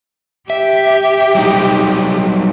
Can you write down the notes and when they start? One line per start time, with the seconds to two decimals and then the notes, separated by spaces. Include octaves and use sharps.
0.50 G4 E5
1.35 F#3 G3 D#4